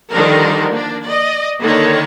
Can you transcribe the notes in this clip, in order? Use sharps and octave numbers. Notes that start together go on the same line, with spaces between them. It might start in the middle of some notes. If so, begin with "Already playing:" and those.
D3 D#3 F3 G3 D4 A#4
A#3 D4
D5 D#5
D3 D#3 A#3 C#5